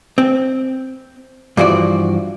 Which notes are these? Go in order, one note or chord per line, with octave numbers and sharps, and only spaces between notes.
C4
G2 E3 F3 F#4 D5